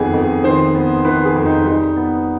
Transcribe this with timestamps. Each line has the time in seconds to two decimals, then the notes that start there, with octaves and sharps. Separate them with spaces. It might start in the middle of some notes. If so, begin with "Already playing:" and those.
Already playing: F2 D#3 B3 G#4
0.14 F2
0.44 D#3 C5
0.75 B3
1.05 D#3 B4
1.26 G#4
1.36 F2
1.46 D#4
1.65 G3 D#4
1.97 B3